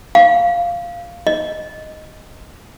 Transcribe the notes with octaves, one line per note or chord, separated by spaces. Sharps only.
F5
D#5